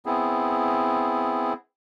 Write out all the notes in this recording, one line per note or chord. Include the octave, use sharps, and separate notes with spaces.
B3 C4 E4 G#4